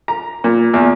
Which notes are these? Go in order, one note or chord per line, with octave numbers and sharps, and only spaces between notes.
A#5
A#2
E2